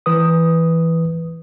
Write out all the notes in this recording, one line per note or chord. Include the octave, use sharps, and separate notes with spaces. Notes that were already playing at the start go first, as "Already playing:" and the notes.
E3 B4 D#6